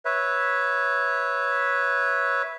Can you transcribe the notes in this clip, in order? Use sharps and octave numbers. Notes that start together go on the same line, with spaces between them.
B4 C#5 E5